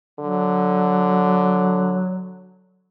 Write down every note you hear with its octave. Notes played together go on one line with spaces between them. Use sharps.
D3 F#3